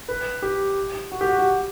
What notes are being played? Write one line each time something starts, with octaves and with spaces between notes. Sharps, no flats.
B4
G4
F#4
G4
F#4
G4